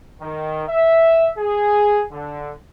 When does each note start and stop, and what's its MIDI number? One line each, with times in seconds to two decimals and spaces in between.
0.21 0.64 51
0.69 1.29 76
1.38 2.04 68
2.12 2.51 50